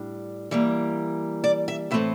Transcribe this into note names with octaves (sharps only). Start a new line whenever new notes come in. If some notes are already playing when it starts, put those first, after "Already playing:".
Already playing: A2 G3 D4
E3 G3 A#3
D5
E5
A2 E3 A3 C4 E5